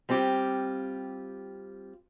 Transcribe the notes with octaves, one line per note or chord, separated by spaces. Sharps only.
G3 C4 F4 G4